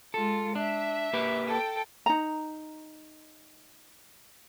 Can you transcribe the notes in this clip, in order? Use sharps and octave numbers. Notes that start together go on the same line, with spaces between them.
G#3 F4 A4
D4 E5
A#3 G4 B4
A4 G5
D#4 A#5